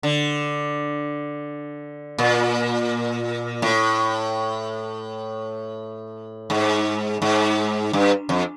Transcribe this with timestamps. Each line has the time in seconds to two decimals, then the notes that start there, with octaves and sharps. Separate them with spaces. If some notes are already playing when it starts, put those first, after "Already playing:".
0.03 D3
2.18 A#2
3.62 A2
6.50 G#2
7.22 G#2
7.93 G2
8.29 F2